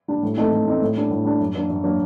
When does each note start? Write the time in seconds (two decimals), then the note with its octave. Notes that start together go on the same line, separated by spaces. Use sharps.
0.08 G3 D4
0.23 A2
0.37 A3 C4 D#4
0.52 A2
0.67 A3 C4 D#4
0.82 A2
0.97 G3 D4
1.11 A2
1.25 G3 D4
1.40 F#2
1.54 F#3 A#3 D4
1.70 F#2
1.84 F#3 A#3 D4